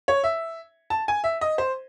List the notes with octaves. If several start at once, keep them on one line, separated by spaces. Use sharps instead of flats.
C#5
E5
A5
G#5
E5
D#5
C5